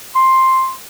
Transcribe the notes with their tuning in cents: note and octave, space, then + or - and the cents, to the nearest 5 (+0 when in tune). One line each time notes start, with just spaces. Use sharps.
C6 +5